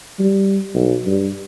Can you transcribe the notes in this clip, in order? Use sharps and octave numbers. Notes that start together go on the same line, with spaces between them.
G3
B1
G2